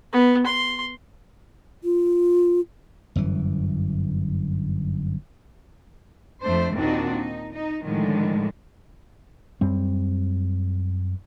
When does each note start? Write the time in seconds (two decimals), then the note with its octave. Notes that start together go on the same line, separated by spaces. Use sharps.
0.13 B3
0.46 C6
1.84 F4
3.16 G1 F#2 E3
6.42 F2 A3 D4 C5
6.73 D#2 A#2 C4 D4 D#4 F#4
7.15 D#4
7.54 D#4
7.85 A2 D3 D#3 F3 G#3
9.61 F#2 G3 C4